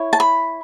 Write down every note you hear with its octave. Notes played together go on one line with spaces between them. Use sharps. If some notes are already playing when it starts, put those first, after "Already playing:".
Already playing: E4 C#5
A5
B5